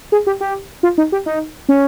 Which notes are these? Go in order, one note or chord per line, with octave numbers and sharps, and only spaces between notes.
G#4
G4
G4
F4
D#4
G4
D#4
C#4